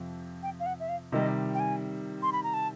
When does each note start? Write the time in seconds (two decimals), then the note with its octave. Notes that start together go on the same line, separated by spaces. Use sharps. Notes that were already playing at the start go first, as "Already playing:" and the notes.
Already playing: F2 C3 F3
0.43 G5
0.60 F5
0.66 F#5
0.80 E5
0.89 F5
1.12 C3 D#3 G3 D#5
1.54 G5
1.60 G#5
2.22 C6
2.32 B5
2.43 A#5
2.53 A5